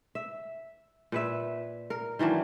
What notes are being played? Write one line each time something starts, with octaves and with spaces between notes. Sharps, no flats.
E5
A#2 B4 E5
A#4
D#3 E3 F#3 D4